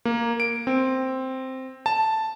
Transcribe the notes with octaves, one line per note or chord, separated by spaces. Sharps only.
A#3
D7
C4
A5